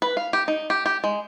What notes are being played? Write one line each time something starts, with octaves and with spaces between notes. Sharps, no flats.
B4
F5
G4
D#4
G4
G4
G#3